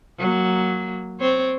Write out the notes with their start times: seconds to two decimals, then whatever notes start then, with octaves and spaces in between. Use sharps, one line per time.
0.19 F#3 A#3
1.20 C4 C5 C#5